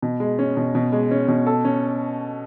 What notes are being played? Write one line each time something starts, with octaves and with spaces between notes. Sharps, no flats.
B2
G#3
C#4
B2
B2
G#3
C#4
B2
A4
C#4